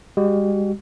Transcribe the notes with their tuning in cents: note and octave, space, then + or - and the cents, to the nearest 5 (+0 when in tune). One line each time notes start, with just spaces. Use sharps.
G#3 -45 F#4 +45